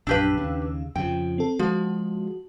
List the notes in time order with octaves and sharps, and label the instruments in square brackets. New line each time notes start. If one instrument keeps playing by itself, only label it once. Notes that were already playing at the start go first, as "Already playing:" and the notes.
[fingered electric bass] A#1 F#2 [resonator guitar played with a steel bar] D4 G4 B4 [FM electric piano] F5 E6
[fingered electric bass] D#2 C#3
[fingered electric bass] F2 C#3 F3 [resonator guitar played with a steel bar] G5
[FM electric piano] C4 A4
[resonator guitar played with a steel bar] F3 [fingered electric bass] G#3 [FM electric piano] F#4